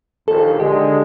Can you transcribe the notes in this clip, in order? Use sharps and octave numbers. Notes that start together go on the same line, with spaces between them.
A#1 D#2 A4
D3 G#3 G4